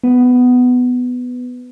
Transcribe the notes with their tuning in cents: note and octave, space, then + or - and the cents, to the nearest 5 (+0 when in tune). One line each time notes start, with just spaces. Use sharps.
B3 +10